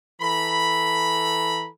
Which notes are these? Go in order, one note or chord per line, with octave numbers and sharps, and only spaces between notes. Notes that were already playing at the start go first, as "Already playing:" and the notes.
E3 A4 A#5 B5